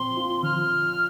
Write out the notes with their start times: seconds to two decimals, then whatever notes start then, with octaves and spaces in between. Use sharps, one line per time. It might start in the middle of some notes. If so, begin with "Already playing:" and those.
Already playing: A#2 F3 C4 C6
0.17 F4
0.43 F3 F6